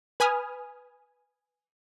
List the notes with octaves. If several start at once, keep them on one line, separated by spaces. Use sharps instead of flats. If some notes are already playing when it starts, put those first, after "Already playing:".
B4 G#5 B5 D#6 F6